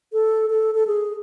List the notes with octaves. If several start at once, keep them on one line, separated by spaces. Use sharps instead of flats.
A4
A4
A4
G#4